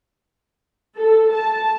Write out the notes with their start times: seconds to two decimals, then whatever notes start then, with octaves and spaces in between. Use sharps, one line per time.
0.98 A4
1.34 A5